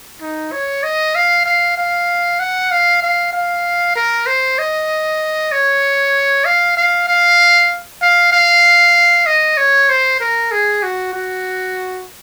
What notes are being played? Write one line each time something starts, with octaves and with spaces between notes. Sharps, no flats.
D#4
C#5
D#5
F5
F5
F5
F#5
F5
F5
F5
A#4
C5
D#5
C#5
F5
F5
F5
F5
F5
D#5
C#5
C5
A#4
G#4
F#4
F#4